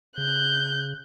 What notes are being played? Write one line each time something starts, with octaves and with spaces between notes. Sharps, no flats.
C#3 F#6 G6